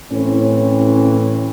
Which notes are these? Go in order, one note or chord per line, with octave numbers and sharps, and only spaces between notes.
A2 E3 C4 C#4